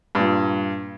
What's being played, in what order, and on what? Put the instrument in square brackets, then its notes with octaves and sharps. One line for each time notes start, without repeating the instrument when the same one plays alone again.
[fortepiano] G2 A#2